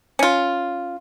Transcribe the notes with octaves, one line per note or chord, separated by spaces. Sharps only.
C#4 F4